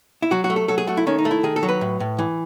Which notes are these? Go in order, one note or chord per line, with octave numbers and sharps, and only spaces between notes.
E4
F#3 F#4
F#4
A3
A4
F#3 A4
G#4
A3 F#4
E4
D#3 C#4
D#4
A3
E4
D#3 G#4
A4
F#3
B4
A2
A2
E3